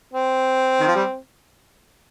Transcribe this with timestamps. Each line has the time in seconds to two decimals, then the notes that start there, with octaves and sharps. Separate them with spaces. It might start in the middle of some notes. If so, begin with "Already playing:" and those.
0.14 C4
0.80 D#3
0.87 F3
0.95 G3